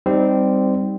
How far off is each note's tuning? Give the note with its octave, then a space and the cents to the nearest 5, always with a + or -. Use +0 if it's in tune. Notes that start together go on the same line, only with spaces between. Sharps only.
G3 +0 C4 -15 D#4 +0